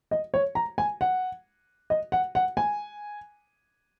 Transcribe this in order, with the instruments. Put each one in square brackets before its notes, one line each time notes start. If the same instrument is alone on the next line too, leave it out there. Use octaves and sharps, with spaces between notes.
[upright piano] D#5
C#5
A#5
G#5
F#5
D#5
F#5
F#5
G#5